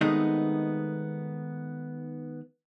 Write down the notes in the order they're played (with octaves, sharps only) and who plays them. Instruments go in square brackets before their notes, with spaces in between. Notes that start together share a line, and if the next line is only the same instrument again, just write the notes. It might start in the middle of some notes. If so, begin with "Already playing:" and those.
[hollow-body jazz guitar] D#3 G#3 A3 B3 C4 D#4